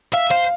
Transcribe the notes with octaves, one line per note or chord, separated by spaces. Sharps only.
E5 F5
C5 F5